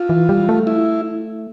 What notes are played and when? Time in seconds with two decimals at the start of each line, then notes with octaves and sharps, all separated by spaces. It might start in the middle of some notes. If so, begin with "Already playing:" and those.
Already playing: F4
0.09 E3
0.29 G3
0.49 A3
0.67 E4